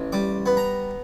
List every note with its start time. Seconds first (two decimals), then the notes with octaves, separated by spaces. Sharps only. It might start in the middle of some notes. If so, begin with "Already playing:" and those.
Already playing: A1
0.13 G3 D6
0.46 B3
0.57 A#5